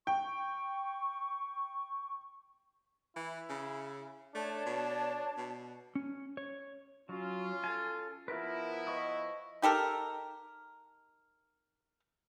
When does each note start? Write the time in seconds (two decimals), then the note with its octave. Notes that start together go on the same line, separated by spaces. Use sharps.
0.07 G5 C#6
3.16 E3 E4
3.49 C#3
4.35 A3 D4 C#5 D5 A5
4.66 B2
5.37 B2
5.95 C#4
6.37 C#5
7.09 F#3 C#4 F4
7.64 A4 G#5
8.28 F3 B3 E4 F4 A#4 B4
8.87 D#5 C#6 D#6
9.62 D#4 G4 A4 A#4